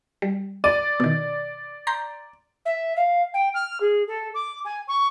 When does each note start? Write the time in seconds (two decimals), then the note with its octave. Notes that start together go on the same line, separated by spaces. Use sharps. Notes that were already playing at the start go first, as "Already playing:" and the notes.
0.22 G3
0.64 D5 D#7
1.00 B2 D#3
1.87 A#5 C6 G6
2.65 E5
2.96 F5
3.34 G5
3.54 F6
3.80 G#4
4.07 A4
4.34 D6
4.65 G#5
4.88 C#6